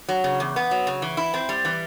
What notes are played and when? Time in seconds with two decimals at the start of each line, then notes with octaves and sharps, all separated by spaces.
0.09 F#3
0.24 C#3
0.40 E2
0.56 B3
0.71 F#3
0.87 C#3
1.02 E3
1.17 E4
1.34 C4
1.49 G3
1.65 E3